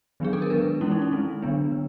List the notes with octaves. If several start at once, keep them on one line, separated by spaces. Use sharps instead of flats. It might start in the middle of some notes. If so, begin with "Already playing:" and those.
D#3 F#3 B3 D4 G#4
A4
A#4
D#3 G#3 B3 D4 B4
E3 G#3 C#4 E4
D#4
E4
D#3 G#3 C4
D3 F#3 B3 D4
D3